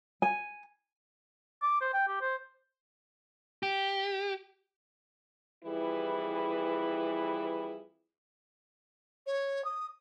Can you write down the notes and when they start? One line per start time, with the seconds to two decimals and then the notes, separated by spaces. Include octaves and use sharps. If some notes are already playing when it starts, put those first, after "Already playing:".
0.22 G#5
1.62 D6
1.81 C5
1.93 G5
2.08 G4
2.21 C5
3.63 G4
5.64 F2 E3 G3 E4 G#4 B4
9.26 C#5
9.64 D#6